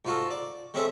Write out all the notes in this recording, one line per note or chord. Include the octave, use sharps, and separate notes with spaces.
G#2 F4 F#4 A4
D5
G#3 C4 C#4 G#4 A4 E5